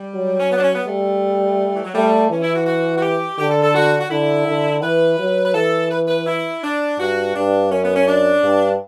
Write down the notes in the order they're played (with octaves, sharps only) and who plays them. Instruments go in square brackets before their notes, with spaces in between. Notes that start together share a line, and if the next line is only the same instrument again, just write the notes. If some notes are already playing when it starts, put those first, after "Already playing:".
Already playing: [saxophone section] G3
[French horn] F#3
[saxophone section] C#4
B3
D4
C#4
B3
[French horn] G3 [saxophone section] A3
[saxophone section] E3
F#3
[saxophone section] G3 [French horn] A3
[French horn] E3 [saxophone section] C#4
[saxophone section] E4
F#4
F#4
F#4
G4
[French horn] D3 [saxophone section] G4
[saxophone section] A4
A4
F#4
F#4
[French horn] D3 [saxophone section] E4
[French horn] D3
[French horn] E3 [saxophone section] B4
[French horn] F#3
[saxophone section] B4
[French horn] E3 [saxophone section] A4
[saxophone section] B4
B4
E4
D4
[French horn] G2 [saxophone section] F#4
[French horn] G2 [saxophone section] D4
[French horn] F#2 [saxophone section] C#4
[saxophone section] B3
C#4
D4
[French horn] G2